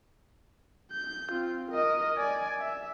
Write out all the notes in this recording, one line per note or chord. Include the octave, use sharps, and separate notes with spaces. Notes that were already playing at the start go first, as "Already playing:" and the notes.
G6
C4 F4
A#4 D#5
D5 G#5
E5